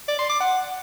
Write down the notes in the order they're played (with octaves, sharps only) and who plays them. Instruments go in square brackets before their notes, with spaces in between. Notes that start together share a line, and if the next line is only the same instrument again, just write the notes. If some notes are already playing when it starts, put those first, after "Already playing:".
[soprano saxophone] D5
C6
D6
F#5